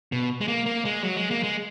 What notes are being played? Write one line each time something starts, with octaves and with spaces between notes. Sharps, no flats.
B2
G#3
A#3
A#3
G#3
F#3
G#3
A#3
G#3